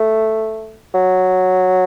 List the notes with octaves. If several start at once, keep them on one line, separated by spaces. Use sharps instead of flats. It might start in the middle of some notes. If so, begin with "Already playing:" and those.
Already playing: A3
F#3